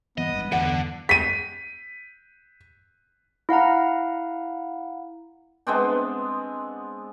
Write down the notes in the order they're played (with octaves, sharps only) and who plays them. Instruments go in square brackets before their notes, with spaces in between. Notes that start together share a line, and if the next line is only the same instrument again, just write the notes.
[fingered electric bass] G2 E3 [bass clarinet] B3 [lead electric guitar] D#5
[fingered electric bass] G#1 G2
[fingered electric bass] E2 G2 E3 [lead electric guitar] D3 [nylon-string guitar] F#5
[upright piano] B6 D#7
[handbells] E4 F5 F#5 A#5
[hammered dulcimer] G#3 B3 C4 D4